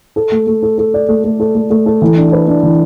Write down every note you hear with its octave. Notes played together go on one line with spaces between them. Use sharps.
A4
A3
A3
A4
A4
D5
A3
A3
A4
A3
A3
A4
E3
D4
B4
D4
E3